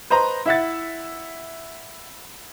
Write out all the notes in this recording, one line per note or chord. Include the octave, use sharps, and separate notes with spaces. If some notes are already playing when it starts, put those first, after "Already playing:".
B4 C5 D#5 A#5
E4 E5 F#5 A6